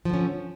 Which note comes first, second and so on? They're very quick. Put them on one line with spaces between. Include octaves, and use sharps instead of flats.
F3 D3 C#4